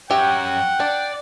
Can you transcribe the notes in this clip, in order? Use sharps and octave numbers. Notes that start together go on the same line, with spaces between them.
F#2 G4 C#5 E5 F#5 G5
D4 D5